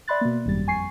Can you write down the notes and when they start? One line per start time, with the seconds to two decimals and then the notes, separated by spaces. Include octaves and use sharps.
0.08 D5 E5 B5 C6 F#6 A6
0.21 B2 A#3
0.46 G#1 F#2 G3 A6
0.67 F2 G#5 C#6 C7